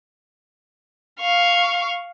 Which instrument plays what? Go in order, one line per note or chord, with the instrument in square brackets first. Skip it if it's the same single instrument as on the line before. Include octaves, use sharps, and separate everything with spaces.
[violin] F5 C#6